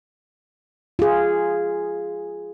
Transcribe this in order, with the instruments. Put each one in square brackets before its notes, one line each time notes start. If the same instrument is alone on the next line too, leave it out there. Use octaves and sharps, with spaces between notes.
[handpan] F4 G#4